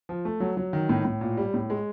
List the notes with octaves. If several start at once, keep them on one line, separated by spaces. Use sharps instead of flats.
F3
A3
F#3
F#3
D#3
A2
A2
A#2
G3
A2
G#3